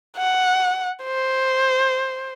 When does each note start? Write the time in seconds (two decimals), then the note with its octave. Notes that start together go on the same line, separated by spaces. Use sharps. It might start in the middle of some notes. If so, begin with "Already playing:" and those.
0.18 F#5
1.04 C5